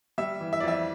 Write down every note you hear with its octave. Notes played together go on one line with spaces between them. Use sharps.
G3 E5
E3
E5
D5
F2 E5